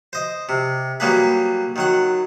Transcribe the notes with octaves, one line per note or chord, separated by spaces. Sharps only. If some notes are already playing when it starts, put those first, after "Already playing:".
C5 D#5
C3
F#3 G3 A#3 G#4 B4
D#3 F#3 F#5